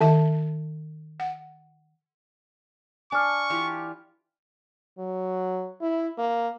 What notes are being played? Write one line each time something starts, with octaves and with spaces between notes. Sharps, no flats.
D#3 E5 A5
F#5
D4 G#5 C#6 D6 F6
E3 F4 G4
F#3
E4
A#3